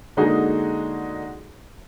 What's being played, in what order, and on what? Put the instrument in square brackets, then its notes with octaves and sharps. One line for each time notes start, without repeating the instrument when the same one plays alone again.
[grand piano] D3 G#3 A#3 D#4 F#4 G#4